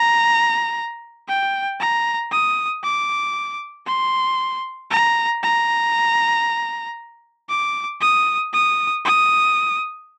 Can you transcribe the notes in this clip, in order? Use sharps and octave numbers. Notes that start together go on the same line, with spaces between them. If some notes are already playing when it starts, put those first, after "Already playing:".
Already playing: A#5
G5
A#5
D#6
D6
C6
A#5
A#5
D6
D#6
D#6
D#6